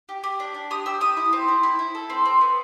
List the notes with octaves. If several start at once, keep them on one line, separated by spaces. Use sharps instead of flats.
G4
G4
D4
D4
G4 D#6
G4 E6
G4 D#6
E4
C4
E4
E4
E4
A4
C4
C4
B3